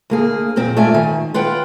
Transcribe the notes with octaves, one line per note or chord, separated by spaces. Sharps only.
D2 A#3 G#4
F2 A#2 C4
G#2 A3 F4 D5 E5 G#5
D#3
F4 B4 F#5 G5